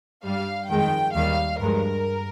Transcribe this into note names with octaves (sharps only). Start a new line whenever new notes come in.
G2 G3 F5
F2 D#3 G#3 G5
D#2 D#3 G3 F5
G2 F3 G#3 A#4